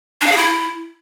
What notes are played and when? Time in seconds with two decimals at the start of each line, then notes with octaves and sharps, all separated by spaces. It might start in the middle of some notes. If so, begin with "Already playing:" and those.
0.21 D4
0.26 F5
0.32 G#4
0.37 E4